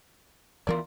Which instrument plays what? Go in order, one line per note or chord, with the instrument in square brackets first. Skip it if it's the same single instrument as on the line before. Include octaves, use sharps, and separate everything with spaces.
[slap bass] D2 E3 B3 [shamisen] F4 A#4 D5